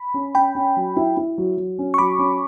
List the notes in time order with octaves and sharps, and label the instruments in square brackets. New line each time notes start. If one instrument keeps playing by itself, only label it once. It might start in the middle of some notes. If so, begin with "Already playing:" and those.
Already playing: [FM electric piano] B5
[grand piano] C#4
[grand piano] C#4 [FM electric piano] G5 B5
[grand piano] C#4
F#3
E4
E4
F#3
F#3
C#4
[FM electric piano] C#6
[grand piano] F#3 [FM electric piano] B5 D6
[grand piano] C#4